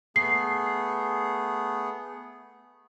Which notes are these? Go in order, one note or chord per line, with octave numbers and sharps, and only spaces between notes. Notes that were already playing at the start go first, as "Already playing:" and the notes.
A3 B3 G#4 C7